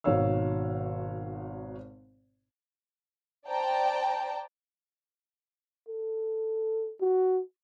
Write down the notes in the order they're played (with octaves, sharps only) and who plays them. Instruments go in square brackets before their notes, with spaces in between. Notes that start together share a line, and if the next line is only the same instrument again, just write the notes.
[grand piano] G#1 B2 D#4 C#5 F5 E6
[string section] C5 D5 G5 A5 A#5
[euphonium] A4
F#4